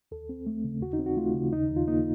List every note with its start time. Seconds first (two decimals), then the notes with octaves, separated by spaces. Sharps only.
0.11 D#2 A4
0.29 C4
0.47 A3
0.64 C#3
0.81 D#2 F#4
0.93 D#4
0.99 C4
1.06 F#4
1.17 A3 F4
1.34 C#3
1.53 D#2 D#4
1.70 D#2
1.76 F4
1.88 A#3 D#4